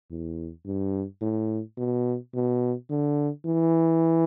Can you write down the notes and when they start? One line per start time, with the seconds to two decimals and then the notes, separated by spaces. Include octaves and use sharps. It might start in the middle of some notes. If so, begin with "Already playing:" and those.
0.11 E2
0.65 G2
1.21 A2
1.78 B2
2.34 B2
2.90 D3
3.46 E3